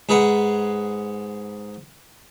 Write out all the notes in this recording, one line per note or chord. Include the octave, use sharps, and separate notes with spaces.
G#2 G#4 B4 F#5